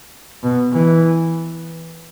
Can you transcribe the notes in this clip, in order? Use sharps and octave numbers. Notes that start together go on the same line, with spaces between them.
B2
E3